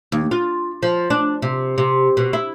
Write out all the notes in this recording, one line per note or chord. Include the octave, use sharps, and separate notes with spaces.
D#2
F4
F3
D4
C3
C3
B2
E4